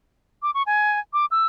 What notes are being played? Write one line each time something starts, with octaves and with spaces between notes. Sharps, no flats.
D6
C#6
G#5
D6
E6